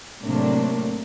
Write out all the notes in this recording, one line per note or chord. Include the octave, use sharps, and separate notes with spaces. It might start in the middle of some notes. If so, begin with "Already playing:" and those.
A2 C3 F#3 A#3 D4